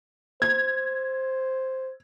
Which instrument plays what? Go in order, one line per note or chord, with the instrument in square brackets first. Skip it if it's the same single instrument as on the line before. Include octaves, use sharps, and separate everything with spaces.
[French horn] C5 [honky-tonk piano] G#6